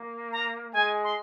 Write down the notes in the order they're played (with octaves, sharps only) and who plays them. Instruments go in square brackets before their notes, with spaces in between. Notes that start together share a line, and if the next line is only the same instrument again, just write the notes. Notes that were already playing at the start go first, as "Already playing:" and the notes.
Already playing: [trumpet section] A#3
[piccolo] A#5
[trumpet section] G#3 [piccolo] G#5
[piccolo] C6